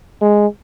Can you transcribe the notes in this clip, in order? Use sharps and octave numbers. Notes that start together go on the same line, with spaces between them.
G#3